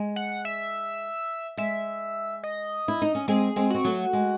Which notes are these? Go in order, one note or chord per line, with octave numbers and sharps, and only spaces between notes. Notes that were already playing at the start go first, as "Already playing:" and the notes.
Already playing: G#3
F#5
E5
G#3 E5
D#5
E4
D#4
C#4
G#3 C4 G#4
G#3 C4
C4 F#4
F#3 A3
G#3